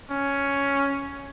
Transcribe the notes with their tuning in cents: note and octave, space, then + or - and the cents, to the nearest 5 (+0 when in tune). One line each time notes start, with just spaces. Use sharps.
C#4 +5